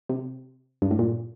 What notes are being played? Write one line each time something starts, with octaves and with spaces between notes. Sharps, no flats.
C3
G2
A2
A#2